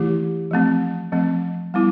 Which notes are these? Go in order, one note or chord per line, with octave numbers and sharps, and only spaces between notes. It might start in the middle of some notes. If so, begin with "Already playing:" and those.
Already playing: E3 A3 E4 G4
F3 A3 C4
F3 A3 C4
G3 B3 E4